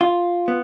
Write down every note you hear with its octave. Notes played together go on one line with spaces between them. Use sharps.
F4
B3